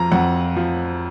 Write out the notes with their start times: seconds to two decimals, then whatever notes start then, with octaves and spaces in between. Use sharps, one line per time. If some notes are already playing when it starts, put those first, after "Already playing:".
Already playing: F2 F3 A#5
0.12 F2 F#5
0.56 F3